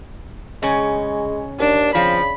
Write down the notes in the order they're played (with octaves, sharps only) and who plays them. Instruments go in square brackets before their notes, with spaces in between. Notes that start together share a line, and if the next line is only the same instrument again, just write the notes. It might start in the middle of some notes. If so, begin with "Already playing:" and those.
[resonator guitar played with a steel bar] C#3 C#4 [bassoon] G#3
[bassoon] D#2 [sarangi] D4
[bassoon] C#3 [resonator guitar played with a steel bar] F3 C4 [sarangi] B5